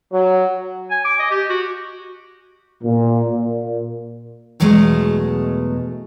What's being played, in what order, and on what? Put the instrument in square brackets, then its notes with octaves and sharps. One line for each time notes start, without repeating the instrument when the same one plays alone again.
[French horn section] F#3
[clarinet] G#5
D6
D#5
G4
F#4
[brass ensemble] A#2
A#2
[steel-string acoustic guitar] E2 B2 F#3 G#3 A3 D#5